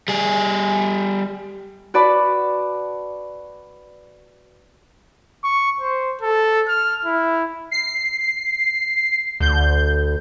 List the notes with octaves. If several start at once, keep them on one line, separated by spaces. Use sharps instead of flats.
G3 G#4
F#4 B4 D5 A5 B5
C#6
C5
A4
F6
E4
C7
D2 G6